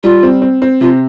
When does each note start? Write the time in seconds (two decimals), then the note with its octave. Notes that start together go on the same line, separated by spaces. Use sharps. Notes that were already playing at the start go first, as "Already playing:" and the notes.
0.04 G3 F4
0.23 C4
0.42 C4
0.62 C4
0.81 C3 F4